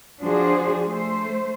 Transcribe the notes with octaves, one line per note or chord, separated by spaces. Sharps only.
F3 D4 F#4 G#4 C5
A3 C5